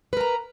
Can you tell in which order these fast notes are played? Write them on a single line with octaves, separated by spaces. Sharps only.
B4 A#4 A#5